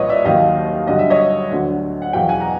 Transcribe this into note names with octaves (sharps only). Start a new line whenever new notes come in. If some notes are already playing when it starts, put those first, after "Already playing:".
Already playing: C2 A#2 F3 B4 C#5 D#5
D5 E5
D#2 D#3 F#3 D#5 F5
G2 D3 F#3 D#5
E5
C#5 D#5
D2 D3 F#3
F#5
E2 B2 F#3 F5 G5
F#5 G#5
A#5